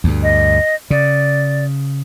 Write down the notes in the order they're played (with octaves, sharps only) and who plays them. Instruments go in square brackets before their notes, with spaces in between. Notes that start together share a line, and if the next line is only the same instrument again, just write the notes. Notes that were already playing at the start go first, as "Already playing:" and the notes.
[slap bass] D2 G2
[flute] D#5
[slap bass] C#3 [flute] D5